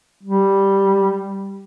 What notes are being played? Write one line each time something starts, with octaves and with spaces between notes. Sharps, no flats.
G3